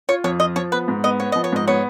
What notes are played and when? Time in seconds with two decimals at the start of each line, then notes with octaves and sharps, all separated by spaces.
0.09 F4 C#5
0.24 F2 C#5
0.40 F4 D#5
0.56 F3 C#5
0.72 B3 B4
0.88 G#2
1.04 B3 D#5
1.20 B3 C#5
1.32 F3 D#5
1.44 C#5
1.52 G#2 D#5
1.68 B3 C#5